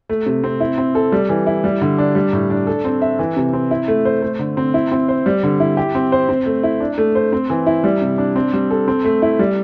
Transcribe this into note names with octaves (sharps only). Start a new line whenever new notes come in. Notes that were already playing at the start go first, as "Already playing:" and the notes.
A3
C3
C4
E4
C4
A4
G3
E3
E4
G3
D3
D4
G3
A2
D4
A4
C4
E5
E3
C3
C4
E4
A3
C5
A3
D3
C4
E4
C4
C5
G3
D3
E4
G4
C4
C5
C4
A3
E4
D4
A3
C5
C4
E3
E4
G3
C3
D4
C4
G3
A4
C4
A3
E4
G3